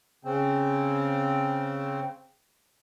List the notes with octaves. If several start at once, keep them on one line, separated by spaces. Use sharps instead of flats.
C#3 C4